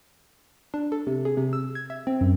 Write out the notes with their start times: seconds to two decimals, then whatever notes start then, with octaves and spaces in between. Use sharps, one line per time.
0.74 D4
0.92 A4
1.07 C3
1.25 G#4
1.37 C3
1.53 E6
1.75 G#6
1.90 E5
2.07 C4
2.21 F#2